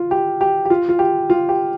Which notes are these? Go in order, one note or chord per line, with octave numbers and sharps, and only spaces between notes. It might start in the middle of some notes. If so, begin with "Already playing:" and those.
Already playing: F4
G4
G4
G4
F4
F4
G4
F4
G4